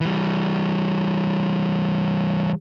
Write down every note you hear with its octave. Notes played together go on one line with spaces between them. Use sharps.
E3 G3